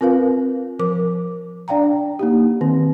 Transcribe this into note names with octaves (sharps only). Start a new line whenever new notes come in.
C4 F4 A#4 B4 F5
F3 A#4 D6
D4 D5 F5 G5 A#5
A#3 D#4 G4
D#3 C4